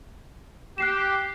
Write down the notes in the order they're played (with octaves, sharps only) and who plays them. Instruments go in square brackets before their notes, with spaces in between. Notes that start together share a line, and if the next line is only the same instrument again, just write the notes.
[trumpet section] G4 [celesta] F#6 C7 E7